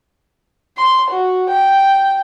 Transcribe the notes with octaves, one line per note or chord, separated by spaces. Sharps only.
C6
F#4
G5